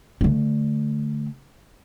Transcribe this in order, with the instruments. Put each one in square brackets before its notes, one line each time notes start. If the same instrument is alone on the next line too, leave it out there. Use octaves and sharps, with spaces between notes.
[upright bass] D3 A3